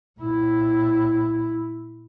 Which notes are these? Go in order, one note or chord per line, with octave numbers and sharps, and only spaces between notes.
A#2 E4